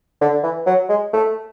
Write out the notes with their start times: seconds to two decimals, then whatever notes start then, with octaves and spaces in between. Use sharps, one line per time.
0.21 D3
0.43 E3
0.66 F#3
0.89 G#3
1.13 A3